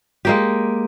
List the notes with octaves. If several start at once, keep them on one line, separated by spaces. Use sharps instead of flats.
G#3 A#3 G4